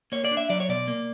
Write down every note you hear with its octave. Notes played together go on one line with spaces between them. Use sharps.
A#3 C#5
D5
D4
E5
F#3 D5
C#5
B2 D5
A#3